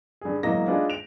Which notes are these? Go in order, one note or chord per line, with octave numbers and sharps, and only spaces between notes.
G2 G#4
E1 E3 F#3 A#3 D#5 A#6
D4 D#4 F4 G#4 B4
D7 F7